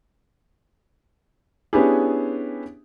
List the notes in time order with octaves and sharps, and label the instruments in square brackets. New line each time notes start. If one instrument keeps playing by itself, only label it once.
[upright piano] B3 C#4 D4 E4 G4 G#4